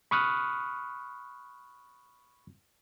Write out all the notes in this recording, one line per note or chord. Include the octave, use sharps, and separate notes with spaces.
B5 C#6 D#6 F6 F#6